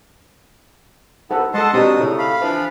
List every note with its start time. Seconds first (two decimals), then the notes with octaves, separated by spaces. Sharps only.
1.31 C2 B3 D#4 A4 F#5
1.54 G#3 A4 D#5 F#5 A5 C6
1.74 B2 C4 D4 D#4 G4 A5 D#6
2.00 A2 C#3
2.19 F5 B5
2.42 E3 F3 D4